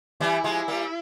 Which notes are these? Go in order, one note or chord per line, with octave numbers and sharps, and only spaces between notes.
E3 G3 E4
F3 G#3
G3 A#3